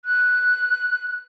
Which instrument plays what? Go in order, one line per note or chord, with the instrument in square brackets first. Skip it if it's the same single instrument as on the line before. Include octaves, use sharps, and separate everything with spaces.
[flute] F#6